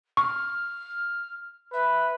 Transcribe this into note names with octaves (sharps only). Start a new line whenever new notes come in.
C#6 F6
B4 E5